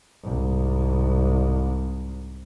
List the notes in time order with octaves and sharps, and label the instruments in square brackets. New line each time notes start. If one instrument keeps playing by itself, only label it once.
[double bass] C2 G#2